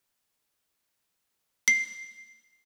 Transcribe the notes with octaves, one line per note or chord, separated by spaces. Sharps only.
C7